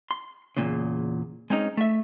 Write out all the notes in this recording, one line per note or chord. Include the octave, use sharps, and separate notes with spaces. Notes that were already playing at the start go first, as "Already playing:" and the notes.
C6
E2 G2 A#2 C#3
G#3 C4 C#4 D#4
A3 E5